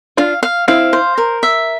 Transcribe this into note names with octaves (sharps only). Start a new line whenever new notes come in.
D4 F4 F5
F5
C4 E4 F5
C5
A#4
E5